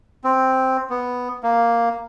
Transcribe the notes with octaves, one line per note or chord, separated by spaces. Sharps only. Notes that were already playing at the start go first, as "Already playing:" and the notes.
C4
B3
A#3